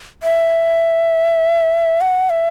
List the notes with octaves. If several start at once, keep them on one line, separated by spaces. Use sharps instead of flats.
E5
F#5
E5